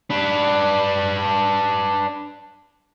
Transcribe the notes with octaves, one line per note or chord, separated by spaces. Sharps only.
D4 B4